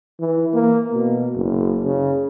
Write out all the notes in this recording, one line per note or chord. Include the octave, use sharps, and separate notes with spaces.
E3
A#3
B2
F#1
C#3